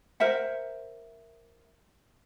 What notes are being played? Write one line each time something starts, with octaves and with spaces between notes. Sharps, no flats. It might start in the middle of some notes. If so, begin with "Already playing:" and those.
A#4 C5 E5 F#5